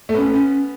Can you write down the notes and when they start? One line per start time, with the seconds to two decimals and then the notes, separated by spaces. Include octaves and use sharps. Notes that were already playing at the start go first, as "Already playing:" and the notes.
0.09 A3
0.15 B3 C#4
0.34 C#4